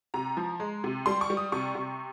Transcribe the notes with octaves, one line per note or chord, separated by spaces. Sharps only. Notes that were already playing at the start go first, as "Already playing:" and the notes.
C3 A#5
F3
G#3
C3
G3 C6
C#6
G3
D#6
C3 C#6
C3